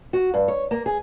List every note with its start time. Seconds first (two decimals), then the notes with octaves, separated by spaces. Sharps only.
0.13 F#4
0.34 G2
0.48 C#5
0.71 A#3
0.86 G#4